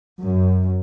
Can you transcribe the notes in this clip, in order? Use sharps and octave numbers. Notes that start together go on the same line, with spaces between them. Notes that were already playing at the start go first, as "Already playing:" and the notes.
F#2